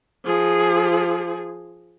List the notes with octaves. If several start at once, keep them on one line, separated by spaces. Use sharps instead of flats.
F3 G#4